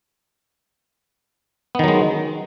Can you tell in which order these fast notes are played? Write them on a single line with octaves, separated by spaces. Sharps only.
B3 D#3 F#3 G#3